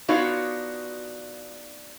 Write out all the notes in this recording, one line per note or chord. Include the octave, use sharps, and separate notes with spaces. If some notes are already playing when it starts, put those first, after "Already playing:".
B3 D4 D#4 F4 F#4 C#5